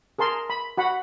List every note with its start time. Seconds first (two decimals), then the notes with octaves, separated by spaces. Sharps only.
0.19 G#4 A#4 A5 C6
0.50 B5
0.77 F#4 F#5 B5